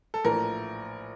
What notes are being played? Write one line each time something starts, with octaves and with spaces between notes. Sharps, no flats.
A4
A#1 A2 E3 A#4